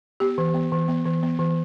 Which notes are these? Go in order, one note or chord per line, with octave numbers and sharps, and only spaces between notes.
B3 G4
E3
B3
E3
B3
E3
B3
E3